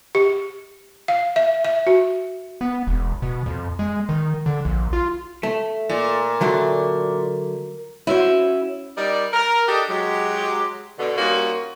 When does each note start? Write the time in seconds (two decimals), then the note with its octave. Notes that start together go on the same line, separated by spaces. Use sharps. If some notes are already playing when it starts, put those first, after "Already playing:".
0.15 G4
1.08 F5
1.36 E5
1.65 E5
1.87 F#4
2.61 B3
2.87 E1
3.22 B2
3.46 F2
3.79 G#3
4.09 D#3
4.46 D3
4.65 A#1
4.93 F4
5.43 A3
5.90 A#2
6.41 D3 F#3 A3
8.07 C#4 E4 F#4 C5
8.97 G3 D#4 A#4 D5
9.33 A#4
9.67 D4 G4 A4 D#5
9.89 F#3 G#3 G4
10.98 B2 D3
11.18 G3 A#3 C#4 D#4 F4 F#4